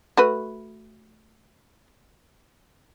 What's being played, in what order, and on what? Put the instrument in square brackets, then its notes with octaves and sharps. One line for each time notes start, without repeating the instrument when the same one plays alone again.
[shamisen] A3 F#4 B4